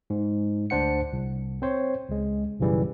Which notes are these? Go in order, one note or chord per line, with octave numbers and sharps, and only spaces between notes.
G#2
D2 D4 C5 F#5 C#7
C2
C4 C5 C#5
C#2 G#3
B1 F#2 C#3 E3 G3